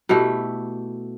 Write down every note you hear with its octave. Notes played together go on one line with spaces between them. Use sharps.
B2 A3 E4 G4